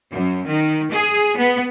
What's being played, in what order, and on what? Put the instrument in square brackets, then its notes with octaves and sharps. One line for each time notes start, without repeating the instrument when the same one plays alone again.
[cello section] F#2
D#3
G#4
B3